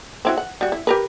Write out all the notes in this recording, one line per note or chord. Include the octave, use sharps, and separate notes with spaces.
C4 E4 F#4
F#5
G3 F#4
E4
G4 A#4 B4